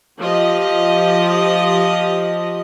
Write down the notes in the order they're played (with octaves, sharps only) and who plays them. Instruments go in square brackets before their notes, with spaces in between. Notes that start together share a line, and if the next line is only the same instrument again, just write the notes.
[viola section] F3 G4 D#5